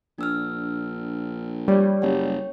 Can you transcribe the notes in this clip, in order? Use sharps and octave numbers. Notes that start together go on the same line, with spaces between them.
A#1 D4 E6 F6
G3 G4 C#5 D5
F#1 C#5 G5